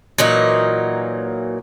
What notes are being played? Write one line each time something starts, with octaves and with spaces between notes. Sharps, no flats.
A#2 E3 F#3 D#4